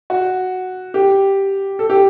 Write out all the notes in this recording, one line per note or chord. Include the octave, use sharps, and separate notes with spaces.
F#4
G4
A4
G4